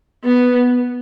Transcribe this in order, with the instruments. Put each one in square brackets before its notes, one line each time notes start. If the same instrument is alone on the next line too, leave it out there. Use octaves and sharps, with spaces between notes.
[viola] B3